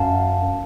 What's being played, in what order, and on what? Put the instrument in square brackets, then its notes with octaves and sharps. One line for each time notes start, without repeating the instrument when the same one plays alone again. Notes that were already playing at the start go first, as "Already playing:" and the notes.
Already playing: [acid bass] F#2 [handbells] F5 A5